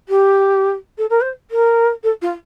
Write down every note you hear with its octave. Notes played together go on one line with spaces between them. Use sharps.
G4
A4
A#4
C5
A#4
A4
F4